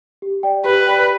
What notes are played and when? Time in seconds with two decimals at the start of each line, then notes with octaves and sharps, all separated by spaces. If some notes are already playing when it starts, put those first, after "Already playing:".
0.22 G4
0.43 D5 G5
0.64 G4 B4
0.87 D5 G5